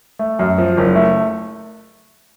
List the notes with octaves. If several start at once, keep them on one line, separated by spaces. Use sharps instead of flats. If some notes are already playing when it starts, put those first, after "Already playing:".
A3
F#2
F3
F#1
A3